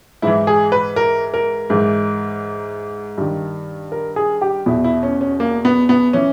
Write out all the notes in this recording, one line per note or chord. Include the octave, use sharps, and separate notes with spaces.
G#2 E3 E4
G#4
B4
A#4
A#4
G#2 E3
G2 D#3
A#4
G#4
G4
E2 B2 E4
E4
C#4
C#4
A#3
B3
B3
E3 C#4